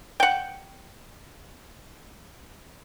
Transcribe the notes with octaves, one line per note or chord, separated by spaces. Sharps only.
F#5 G5